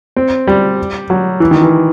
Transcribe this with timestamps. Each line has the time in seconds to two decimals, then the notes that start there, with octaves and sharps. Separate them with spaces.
0.16 C4
0.47 G3
1.10 F#3
1.40 E3
1.51 D#3
1.61 E3